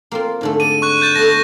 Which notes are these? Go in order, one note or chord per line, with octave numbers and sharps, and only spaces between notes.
A#3 C4 F4
G#2 D3 A3
D5 D#7
C#6 F#6
G6 A6
A3 B3 F#4 A#6